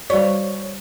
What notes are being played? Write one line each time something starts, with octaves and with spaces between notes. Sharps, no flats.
G3 F#4 C#5 D5